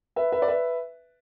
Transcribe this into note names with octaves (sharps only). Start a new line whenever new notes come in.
B4 E5
B4 E5
D5
B4 E5